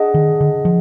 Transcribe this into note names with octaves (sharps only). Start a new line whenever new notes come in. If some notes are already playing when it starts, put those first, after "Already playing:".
Already playing: D4 G#4 D#5 F#5
D#3
D3
F3